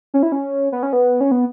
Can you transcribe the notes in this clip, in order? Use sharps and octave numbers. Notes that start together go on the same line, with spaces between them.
C#4
E4
C#4
B3
C#4
B3
C#4
B3